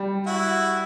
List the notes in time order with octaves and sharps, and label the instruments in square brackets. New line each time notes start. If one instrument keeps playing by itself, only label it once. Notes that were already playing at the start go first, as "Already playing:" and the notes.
Already playing: [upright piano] G3
[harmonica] E4 F#4